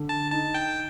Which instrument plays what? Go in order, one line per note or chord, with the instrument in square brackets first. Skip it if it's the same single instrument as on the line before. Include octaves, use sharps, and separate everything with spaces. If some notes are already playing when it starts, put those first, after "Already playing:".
Already playing: [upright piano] D3
[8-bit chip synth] A5
[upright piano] D#4 [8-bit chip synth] A5
[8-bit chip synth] G5